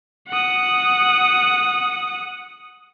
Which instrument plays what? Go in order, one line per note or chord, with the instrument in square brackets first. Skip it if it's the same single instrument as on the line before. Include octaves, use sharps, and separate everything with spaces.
[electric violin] F#5 D#6